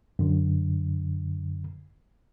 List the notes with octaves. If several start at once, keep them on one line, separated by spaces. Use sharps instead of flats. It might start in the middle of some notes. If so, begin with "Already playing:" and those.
F#2 D3